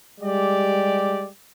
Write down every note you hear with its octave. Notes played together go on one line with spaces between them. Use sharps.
G3 G#3 G4 D5